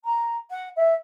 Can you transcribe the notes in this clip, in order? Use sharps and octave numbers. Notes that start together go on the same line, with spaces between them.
A#5
F#5
E5